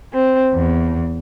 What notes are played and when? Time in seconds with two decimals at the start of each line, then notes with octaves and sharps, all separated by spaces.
0.14 C4
0.54 E2